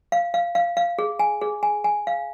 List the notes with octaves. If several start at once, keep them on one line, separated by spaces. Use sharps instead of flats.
F5
F5
F5
F5
G#4
G#5
G#4
G#5
G#5
F5